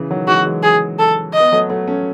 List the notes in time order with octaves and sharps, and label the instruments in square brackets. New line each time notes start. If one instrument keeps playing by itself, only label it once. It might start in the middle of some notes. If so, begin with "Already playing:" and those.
Already playing: [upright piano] C#3 E3
D#3 F#3
[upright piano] E3 G#3 [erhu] F#4
[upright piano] E3 G#3
[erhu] G#4
A4
D#5
[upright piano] B3
F#3 A3
F#3 A3
A3 C#4